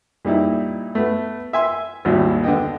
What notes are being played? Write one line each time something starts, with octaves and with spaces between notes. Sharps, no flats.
A#2 G3 D#4 E4
A3 B3 B4
E5 G#5 C6
G#1 D#2 A#2 G3 E4
D3 B3 D#5 G5